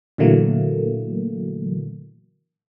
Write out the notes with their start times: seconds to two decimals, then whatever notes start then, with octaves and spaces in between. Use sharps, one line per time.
0.18 A#2 D3 E3 F#3 A3 A#3